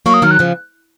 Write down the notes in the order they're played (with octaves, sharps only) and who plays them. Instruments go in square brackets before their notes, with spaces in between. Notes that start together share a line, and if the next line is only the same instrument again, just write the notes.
[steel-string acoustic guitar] F#3 A#3 [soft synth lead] C#6
[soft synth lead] D#6
[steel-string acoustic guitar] D#3 F#3 [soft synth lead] F6
[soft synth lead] F#6
[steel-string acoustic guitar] C#3 F3